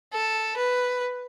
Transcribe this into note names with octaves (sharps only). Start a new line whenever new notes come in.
A4
B4